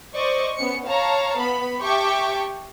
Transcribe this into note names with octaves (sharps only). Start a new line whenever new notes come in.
C5 D5 D#5 C#6
B3 C#4 C#7
C#5 F5 A5 A#5
B3 B5
G4 E5 G5 A5 C#6 D6